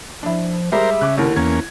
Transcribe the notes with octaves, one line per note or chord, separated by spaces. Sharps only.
F3 D4 E4
G3 G#3 A#4 C5 E5
C#3 D6 F#6
D#2 D3 E4 A#4
E2 A#3 C#4 G#6